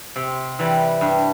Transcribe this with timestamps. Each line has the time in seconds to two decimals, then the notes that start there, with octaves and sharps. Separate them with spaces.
0.16 C3
0.59 E3 G3
1.01 G2